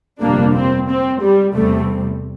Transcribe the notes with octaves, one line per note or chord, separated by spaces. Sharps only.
G1 F2 C3 G3 A#3 D4
C4
C4
G3
E2 C3 G3 A3 C4